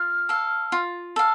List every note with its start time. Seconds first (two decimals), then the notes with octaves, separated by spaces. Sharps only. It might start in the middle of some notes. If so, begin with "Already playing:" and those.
Already playing: F4 F6
0.29 A4 F5
0.72 F4
1.16 A4 F5